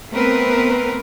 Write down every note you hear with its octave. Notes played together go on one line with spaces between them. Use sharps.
A3 B3 C4 A#4 B4